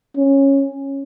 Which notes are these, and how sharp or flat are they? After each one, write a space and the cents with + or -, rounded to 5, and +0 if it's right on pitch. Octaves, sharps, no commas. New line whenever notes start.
C#4 -10